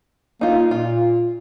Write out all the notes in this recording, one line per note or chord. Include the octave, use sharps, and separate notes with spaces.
A#3 D#4 F4
A#2 F4